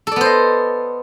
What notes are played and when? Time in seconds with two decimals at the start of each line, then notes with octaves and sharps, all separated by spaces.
0.07 A4
0.12 D5
0.16 B3
0.21 C5
0.25 D#5